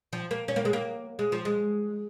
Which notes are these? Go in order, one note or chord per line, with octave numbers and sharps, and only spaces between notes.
F3
A#3
C#4
A#3
G#3
A#3
G#3
F3
G#3